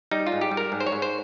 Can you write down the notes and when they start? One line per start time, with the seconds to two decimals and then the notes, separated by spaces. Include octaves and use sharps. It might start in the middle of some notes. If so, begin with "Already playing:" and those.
0.11 G3 D#4
0.26 F4
0.32 G#2
0.41 G4
0.51 G3
0.57 A#4
0.72 G#2
0.80 C5
0.87 C#5
0.92 G#2
1.02 C5